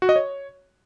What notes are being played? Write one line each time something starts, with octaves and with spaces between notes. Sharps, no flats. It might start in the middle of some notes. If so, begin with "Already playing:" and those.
F#4
D#5
C#5